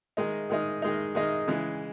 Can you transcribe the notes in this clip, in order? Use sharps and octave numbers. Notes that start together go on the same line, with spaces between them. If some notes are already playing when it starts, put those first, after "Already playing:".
D#3 G#3 D#4
D#3 G#3 D#4
D#3 G#3 D#4
D#3 G#3 D#4
C#3 E3 G#3